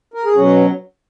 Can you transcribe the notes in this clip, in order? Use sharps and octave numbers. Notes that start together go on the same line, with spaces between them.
A#4
G#4
B2 F#3 C#4 F#4